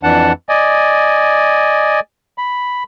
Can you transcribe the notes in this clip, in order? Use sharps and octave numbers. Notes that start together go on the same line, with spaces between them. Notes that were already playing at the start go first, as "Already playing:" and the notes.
F2 E3 D4 F#5 A5
D5 D#5 G#5
B5